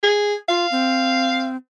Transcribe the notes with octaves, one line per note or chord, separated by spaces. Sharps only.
G#4
F4 F5
C4